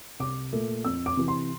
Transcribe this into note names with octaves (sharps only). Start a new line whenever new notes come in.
C2 D6
A#2 A3
F2 E6
D6
C3 E3
C6